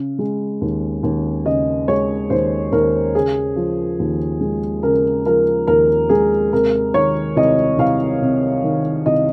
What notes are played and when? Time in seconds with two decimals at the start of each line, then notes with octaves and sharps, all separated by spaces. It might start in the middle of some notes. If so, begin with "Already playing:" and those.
Already playing: C#3
0.19 G#3
0.61 D#2
1.03 D#2
1.45 C#3 D#5
1.88 G#3 C#5
2.30 D#2 C5
2.72 D#2 A#4
3.15 C#3 G#4
3.56 F3
3.99 D#2
4.41 G#3
4.83 C#3 A#4
5.26 F3 A#4
5.67 D#2 A#4
6.09 G#3 G#4
6.52 C3 A#4
6.94 D#3 C#5
7.36 C2 D#5
7.78 C2 F5
8.21 C3
8.64 D#3
9.06 C2 D#5